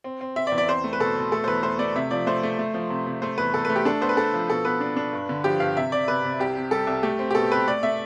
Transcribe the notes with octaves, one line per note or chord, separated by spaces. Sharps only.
C4
C4
C4 E5
D5
E2
D5
C4 C5
A3
B4
B2 A4
B2
A3 A4
C5
E2 B4
A3 C5
A3 D5
C3 E5
F3 D5
A3 C5
A3
A3
F3
C3
C3
A3 C5
E2 B4
E2 A4
A3 B4
G4
D4 A4
B3 C5
B4
D4 A4
F3
B2 A4
B3 B4
D4
D4
G2
D3
F3 G4
G2 F5
C3 E5
C3 D5
C3 B4
C3
C2 G4
C3
G3 A4
C2
A3 G4
C4
G4
B2 A4
C4 B4
A3 D5
A3 E5